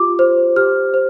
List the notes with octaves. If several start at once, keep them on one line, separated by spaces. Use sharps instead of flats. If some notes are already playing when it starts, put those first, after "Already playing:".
Already playing: F4 G4 D6
C5
G4 F6
C5